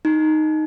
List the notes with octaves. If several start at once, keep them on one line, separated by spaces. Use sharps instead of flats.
D#4